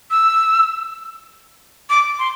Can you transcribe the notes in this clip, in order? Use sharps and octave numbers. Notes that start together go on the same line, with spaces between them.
E6
D6
C6